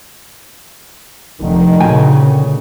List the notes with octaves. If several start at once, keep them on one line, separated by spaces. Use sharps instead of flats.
F1 D3 D#3
D2 A#2 C#3 G5 G#5